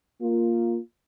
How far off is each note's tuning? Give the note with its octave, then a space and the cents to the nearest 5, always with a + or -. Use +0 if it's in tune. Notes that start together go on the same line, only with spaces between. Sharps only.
A#3 +0 F4 +0